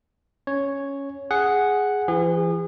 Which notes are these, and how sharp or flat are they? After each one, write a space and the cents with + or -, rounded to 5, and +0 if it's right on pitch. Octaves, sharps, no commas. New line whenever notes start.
C#4 +0 C#5 +0
G#4 +0 F#5 +0
E3 +45 G#4 -35